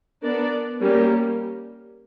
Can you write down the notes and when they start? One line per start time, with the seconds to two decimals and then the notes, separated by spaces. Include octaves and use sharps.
0.23 B3 D4 A#4 D5
0.81 G3 A#3 C#4 G4 A#4